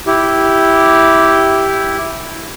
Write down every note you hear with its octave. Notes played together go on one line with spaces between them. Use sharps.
E4 G4